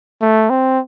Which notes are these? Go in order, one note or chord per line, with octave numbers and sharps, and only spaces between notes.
A3
C4